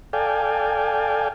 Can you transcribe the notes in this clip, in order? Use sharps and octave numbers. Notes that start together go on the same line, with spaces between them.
A4 D5 F5 G5 G#5